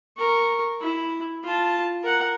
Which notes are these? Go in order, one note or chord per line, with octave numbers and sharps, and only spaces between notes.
A#4 C#6
E4
F4 A5
A#4 F#5